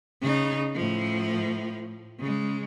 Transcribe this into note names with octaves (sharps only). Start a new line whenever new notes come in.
C#3 D#4
A2 F3
C#3 G#3